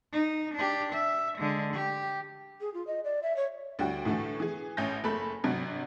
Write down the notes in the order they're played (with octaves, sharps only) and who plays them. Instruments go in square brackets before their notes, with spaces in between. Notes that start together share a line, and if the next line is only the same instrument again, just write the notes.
[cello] D#4
D4 G4
E5
D3 G#3
G4
[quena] G#4
F4
D#5
D5
E5
C#5
[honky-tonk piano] D2 G3 F#4 G5
A2 D3 E3 A3
E3 G#4
A1 C#4 E5 G6 A#6
F#1 A3 A4 B5
G#1 G2 C3 F#3